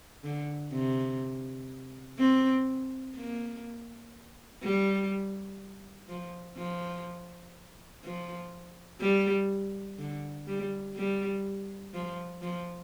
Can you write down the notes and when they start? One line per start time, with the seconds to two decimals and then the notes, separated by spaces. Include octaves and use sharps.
0.24 D3
0.72 C3
2.19 C4
3.16 A#3
4.63 G3
6.09 F3
6.57 F3
8.04 F3
9.01 G3
9.99 D3
10.47 G3
10.96 G3
11.94 F3
12.42 F3